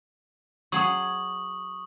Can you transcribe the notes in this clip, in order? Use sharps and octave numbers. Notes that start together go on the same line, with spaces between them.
F#3 G#4 C#5 C#6 D#6 F#7